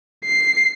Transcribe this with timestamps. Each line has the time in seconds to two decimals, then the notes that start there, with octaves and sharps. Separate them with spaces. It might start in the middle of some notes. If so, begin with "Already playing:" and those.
0.24 C7